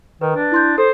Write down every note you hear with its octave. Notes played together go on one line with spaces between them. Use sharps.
D#3 B4
D4
E4 C6 G6
A4 C5